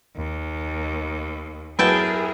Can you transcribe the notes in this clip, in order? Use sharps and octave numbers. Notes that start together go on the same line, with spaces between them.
D#2
F#2 B3 E4 F#4 G#4 A#4 G5 A5